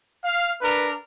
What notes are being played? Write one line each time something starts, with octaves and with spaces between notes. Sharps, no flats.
F5
D4 A#4 B4